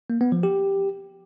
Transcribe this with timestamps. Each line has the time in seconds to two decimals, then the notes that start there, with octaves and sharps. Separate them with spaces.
0.10 A#3
0.21 B3
0.32 F3
0.43 G4